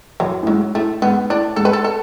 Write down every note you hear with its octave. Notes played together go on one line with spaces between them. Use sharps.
F#2 E3
A2
G#2 F#3
A2 A3
G#2 B3
A2 D4
G#2 A4
B4
A4
A4